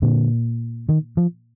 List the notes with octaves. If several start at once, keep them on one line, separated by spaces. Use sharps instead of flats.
A#2 D3
D#3
F3